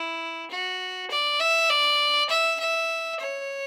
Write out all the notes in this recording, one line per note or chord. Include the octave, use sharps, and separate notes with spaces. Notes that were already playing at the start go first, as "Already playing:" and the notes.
Already playing: E4
F#4
D5
E5
D5
E5
E5
C#5